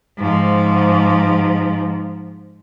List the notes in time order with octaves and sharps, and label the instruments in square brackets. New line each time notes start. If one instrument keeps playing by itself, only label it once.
[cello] G#2 F3